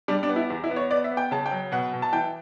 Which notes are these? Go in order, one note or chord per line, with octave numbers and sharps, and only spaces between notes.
G3 D4
D4
B3
E4
E2
E4
B3
C#5
B3 D5
E5
B3
G5
C#3 A5
G5
F#3
B2 F#5
B2
A5
E3 G5